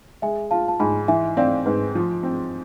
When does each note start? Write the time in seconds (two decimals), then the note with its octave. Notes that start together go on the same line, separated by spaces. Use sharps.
0.22 G#3 E5 G#5
0.51 F4 F5 A5
0.68 A5
0.80 G#2 G#5 B5
1.08 E3 E5 G#5
1.37 C4 D5 F5
1.66 G#2 B4
1.95 F3
2.23 C4